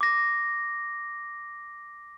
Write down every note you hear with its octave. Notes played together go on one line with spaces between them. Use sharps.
D6 A#6